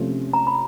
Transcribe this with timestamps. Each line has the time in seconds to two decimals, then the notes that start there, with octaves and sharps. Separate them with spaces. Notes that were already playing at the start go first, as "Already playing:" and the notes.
Already playing: C3 F3 A3 C#4
0.33 A#5
0.47 B5